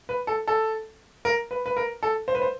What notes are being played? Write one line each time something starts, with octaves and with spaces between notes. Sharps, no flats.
B4
A4
A4
A#4
B4
B4
A#4
A4
C5
B4
C5